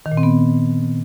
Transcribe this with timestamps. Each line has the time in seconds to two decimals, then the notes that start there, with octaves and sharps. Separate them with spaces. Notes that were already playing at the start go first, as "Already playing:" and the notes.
0.06 D#3
0.12 A#2
0.17 C4
0.23 B3